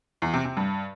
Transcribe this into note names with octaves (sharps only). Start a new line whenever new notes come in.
E2
C3
C3
G2